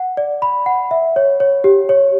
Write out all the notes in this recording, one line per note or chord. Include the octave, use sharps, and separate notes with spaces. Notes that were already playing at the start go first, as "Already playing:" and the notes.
Already playing: F#5
D5
B5
F#5
E5
C#5
C#5
G4
C#5